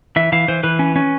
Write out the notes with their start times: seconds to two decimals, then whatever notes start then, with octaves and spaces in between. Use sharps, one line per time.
0.16 E3 E5
0.32 E3 F5
0.48 E3 C5
0.63 E3 B4
0.79 C#4
0.96 C#4